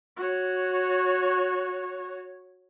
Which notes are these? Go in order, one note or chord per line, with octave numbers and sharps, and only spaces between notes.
F#4 C#5